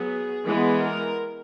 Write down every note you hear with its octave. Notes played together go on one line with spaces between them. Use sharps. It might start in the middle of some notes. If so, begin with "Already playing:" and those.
Already playing: F#3 B3 G#4
E3 G#3 B3
A#4